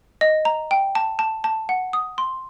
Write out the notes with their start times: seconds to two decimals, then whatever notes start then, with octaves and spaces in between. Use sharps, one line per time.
0.21 D#5
0.45 A#5
0.71 G5
0.95 A5
1.19 A5
1.44 A5
1.69 F#5
1.93 D#6
2.18 C6